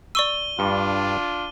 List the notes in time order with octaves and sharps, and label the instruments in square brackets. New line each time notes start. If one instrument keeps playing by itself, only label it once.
[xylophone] D5 C#6 E6 [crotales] D#7 G7
[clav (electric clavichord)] G2 [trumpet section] D4 F4